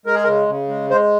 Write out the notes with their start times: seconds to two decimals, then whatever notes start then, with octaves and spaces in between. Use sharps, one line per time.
0.06 G#3 A#4
0.15 G#4
0.23 A#4
0.27 C#3
0.48 C#3
0.69 G#3
0.90 G#3 C5